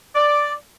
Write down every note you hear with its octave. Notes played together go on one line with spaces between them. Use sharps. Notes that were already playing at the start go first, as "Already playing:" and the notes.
D5